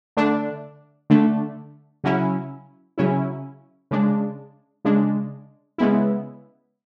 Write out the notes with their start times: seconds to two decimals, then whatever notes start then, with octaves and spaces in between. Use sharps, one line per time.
0.17 D3 A3 D4
1.10 D3 A3 D4
2.04 C#3 F#3 C#4 E4
2.98 C#3 F#3 C#4 E4
3.91 C#3 G#3 D4
4.85 C#3 G#3 D4
5.78 C#3 G#3 B3 E4